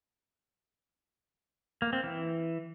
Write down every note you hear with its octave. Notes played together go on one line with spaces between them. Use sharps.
A#3
C4
E3